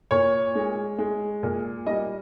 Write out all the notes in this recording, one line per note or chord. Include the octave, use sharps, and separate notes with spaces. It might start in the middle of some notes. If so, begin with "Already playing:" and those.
A#2 C#5
G#3
G#3
A#2
G3 D#5